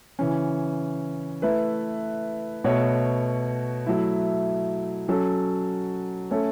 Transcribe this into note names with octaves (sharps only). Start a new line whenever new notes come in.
C#3 E3 C#4
A3 E4 B4
B2 A3 F#4 C#5
F#3 A3 E4
F#3 C#4 A4
A3 C#4 A4 C#5